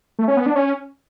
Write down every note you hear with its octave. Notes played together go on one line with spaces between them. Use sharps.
A3
C#4
B3
D4
C#4